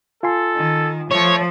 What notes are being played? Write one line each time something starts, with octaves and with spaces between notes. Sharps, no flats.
F4 A4 G#5 C6
D#3
F3 A3 C#5